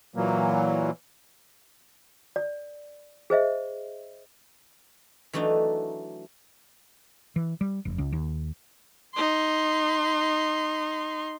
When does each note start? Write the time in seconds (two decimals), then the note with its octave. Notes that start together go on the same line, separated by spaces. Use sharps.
0.16 A#2 E3 F#3 A#3
2.36 D5
3.30 G#4 C5 D#5 E5
5.33 E3 F#3 A3 D4 D#4
7.36 E3
7.61 G3
7.85 F1
7.98 C#2
8.13 D#2
9.14 D#4 C6